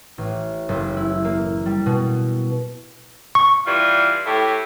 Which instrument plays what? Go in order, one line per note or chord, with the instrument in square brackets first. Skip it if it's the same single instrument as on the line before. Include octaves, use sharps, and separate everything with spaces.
[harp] A1
F#1
E4
A#3
G3
B2
[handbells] C#6
[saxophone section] E3 G3 F4
A2 E4 G4